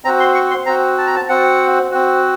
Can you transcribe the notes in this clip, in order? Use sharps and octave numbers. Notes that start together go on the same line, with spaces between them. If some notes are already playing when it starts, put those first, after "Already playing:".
C4 F#4 A#5
C6
C#6
C6
C4 F#4 A#5
A5
A#5
A5
C4 F#4 F#5
C4 F#4